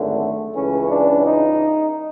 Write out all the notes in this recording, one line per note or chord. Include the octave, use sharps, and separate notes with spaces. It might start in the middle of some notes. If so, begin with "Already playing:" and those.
Already playing: G#1 F#2 D3 A3
C#2 C#3 E3 C#4
D4
D#4